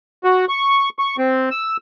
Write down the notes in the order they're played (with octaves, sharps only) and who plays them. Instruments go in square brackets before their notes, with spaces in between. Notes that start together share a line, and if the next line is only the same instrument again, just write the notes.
[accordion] F#4
C#6
C#6
C4
E6